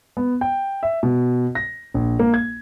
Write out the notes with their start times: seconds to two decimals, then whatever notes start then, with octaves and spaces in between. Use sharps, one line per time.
0.17 B3
0.41 G5
0.83 E5
1.03 B2
1.55 A#6
1.94 A#1
2.19 A#3
2.34 G#6